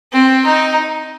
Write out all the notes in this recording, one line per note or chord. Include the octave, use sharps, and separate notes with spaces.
C4
D#4